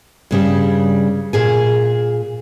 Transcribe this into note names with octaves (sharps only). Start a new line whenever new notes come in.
G2 C#3 G3
A#2 G#4 G#5